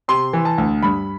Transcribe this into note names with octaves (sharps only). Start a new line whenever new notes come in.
C3 C6
E3
A5
D2
G2 B5